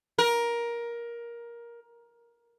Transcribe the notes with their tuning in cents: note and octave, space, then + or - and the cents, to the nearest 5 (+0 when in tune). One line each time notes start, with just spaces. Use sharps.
A#4 +15